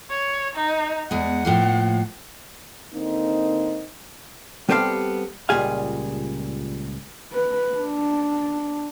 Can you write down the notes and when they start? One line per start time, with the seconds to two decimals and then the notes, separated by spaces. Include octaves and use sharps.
0.10 C#5
0.55 D#4
1.11 E2 G#3 F#5
1.45 A2 F3 A#3
2.94 D3 A#3 C4 D#4
4.69 G3 B3 C4 G4 A4 F5
5.49 C#2 A#2 G3 G#4 F5
7.33 B4
7.78 D4